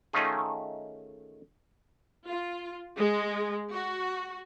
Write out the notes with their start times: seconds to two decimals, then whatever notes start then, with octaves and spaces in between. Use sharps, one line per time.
0.13 D#3 A3 C#4 D#4 F4 G#4
2.25 F4
2.96 G#3
3.73 F#4